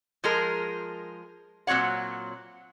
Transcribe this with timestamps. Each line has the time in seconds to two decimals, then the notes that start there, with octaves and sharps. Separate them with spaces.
0.24 F3 G#3 G#4 A#4
1.67 A#2 F#3 C4 C#5 F#5